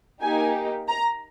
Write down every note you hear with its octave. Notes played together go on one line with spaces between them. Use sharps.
A#3 D#4 G4 G#5
A#5